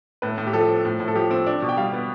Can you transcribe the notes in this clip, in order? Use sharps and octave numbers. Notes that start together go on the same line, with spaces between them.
A2 B4
A2
G4
F3 A4
C4
A2
A2
A4
F3 G4
C4
D4
B2
G5
G3 F5
B3